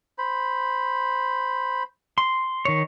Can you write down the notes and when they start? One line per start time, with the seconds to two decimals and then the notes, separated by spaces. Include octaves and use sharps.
0.18 C5 B5
2.18 C6
2.65 D#3 C#5